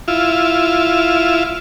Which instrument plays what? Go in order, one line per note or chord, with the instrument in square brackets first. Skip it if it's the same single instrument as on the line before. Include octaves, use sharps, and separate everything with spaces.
[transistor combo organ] E4 F4